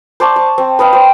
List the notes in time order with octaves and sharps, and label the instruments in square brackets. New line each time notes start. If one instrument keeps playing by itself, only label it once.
[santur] C5 D5 A5 C#6
C#6
C4
B4 D#5 F5 G5
C5